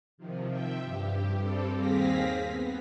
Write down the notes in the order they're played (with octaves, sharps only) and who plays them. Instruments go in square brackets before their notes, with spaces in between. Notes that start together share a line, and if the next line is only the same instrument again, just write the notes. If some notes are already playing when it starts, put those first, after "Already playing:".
[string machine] C3 D#3 F3
F3 E5 G5
G2 G4
G2 G3 C4 G4 A4
D#2 C4 G#4 F5 A#6 B6
B3